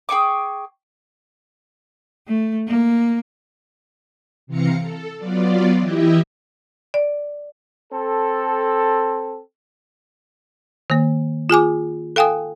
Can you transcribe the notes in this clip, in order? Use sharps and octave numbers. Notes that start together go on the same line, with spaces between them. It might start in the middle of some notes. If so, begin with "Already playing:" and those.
G#4 G5 C#6 D6
A3
A#3
C3 E3 C4 F5 A#5 C#7
A4
F#3 B3 F4 D5
E3 E4 G4 D#5 E5
D5
C4 A4
D#3 A#3
F4 G#4 G#5 D6
A4 F5 G5 G#5 D#6